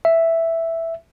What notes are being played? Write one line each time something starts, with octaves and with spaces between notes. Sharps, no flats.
E5